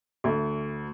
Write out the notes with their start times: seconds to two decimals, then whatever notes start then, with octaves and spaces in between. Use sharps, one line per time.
0.24 D2